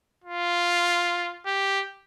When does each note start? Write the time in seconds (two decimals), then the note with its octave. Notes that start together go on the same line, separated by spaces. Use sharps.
0.24 F4
1.46 G4